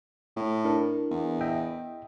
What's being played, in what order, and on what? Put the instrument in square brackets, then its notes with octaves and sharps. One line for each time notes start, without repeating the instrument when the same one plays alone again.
[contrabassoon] A2
[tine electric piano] D4 E4 A#4
[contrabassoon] E2
[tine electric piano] D#5 E5 G5